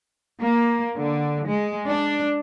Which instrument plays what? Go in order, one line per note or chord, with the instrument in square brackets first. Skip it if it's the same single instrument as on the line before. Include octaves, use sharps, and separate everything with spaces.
[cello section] A#3
D3
G#3
D4